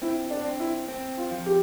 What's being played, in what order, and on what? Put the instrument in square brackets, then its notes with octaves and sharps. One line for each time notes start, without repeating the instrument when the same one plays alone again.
[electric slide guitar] C4 [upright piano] E4
[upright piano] D4
[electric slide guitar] C4
[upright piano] E4
[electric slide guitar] C4
[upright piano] F4
[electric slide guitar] F3
[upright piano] G4